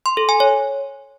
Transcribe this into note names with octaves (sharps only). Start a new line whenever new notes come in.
C6
A4
G#5
C#5